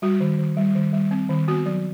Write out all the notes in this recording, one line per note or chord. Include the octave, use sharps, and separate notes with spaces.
G3 F#4
D#3
D#3
G3
D#3
G3
C4
D#3
B3 F#4
F#3